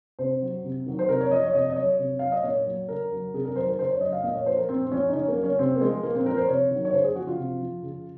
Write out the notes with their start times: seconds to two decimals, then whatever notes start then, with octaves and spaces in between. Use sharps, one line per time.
0.19 C3 C5
0.42 F#3
0.64 C3
0.86 D#3 F#3
0.99 C5
1.09 C3 A#4
1.20 C#5
1.31 F3 D#5
1.43 C#5
1.53 C3 D#5
1.70 D#5
1.76 F#3 C#5
1.99 C3
2.19 F#3 F5
2.32 D#5
2.43 A#2 C#5
2.66 F#3
2.89 C#3 A#4
3.12 F#3
3.34 C3 G#4
3.45 A#4
3.56 D#3 F#3 C5
3.68 A#4
3.78 C#3 C5
3.90 C#5
4.01 F#3 D#5
4.13 F5
4.23 A#2 D#5
4.35 C#5
4.46 F3 C5
4.57 A#4
4.69 A#2 C4
4.86 C4
4.92 F3 C#4
5.08 D#4
5.13 C#3 C#4
5.28 A#3
5.35 F#3
5.43 C#4
5.59 C3 C4
5.76 A#3
5.81 F3 G#3
6.03 A#2 A#3
6.15 C4
6.26 F3 A#4
6.37 C5
6.48 C3 C#5
6.71 D#3 F#3
6.85 C#5
6.93 C#3 C5
7.04 G#4
7.16 F3 F#4
7.27 F4
7.38 C3
7.61 F3
7.83 C#3